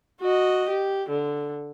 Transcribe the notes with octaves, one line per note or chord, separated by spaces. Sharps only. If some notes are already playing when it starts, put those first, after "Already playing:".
F#4 D#5
G4
D3